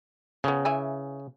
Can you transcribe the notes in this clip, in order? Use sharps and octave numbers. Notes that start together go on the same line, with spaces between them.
C#3 F3 B3
E3 E5 G#5